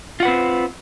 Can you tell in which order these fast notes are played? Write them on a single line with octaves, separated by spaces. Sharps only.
F4 F#5 B4 C4